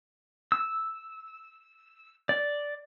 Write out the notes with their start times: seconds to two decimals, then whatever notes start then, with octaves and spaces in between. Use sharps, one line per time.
0.52 E6
2.29 D5